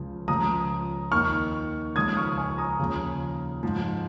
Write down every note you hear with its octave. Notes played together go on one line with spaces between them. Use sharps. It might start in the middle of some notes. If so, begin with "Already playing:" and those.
Already playing: C#2 C#3 F3
C#2 C#3 F3 A#5 D#6
D#2 D#3 C#6 F6
C#2 C#3 F3 D#6 G#6
C#6 F6
G#5 C#6
A#5 D#6
D#2 C#3 F3
G#2 F3